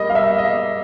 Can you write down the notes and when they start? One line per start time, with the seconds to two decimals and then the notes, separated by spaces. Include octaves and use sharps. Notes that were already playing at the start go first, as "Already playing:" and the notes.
Already playing: G3 A#3 D#5
0.10 F5
0.15 E5
0.38 D#5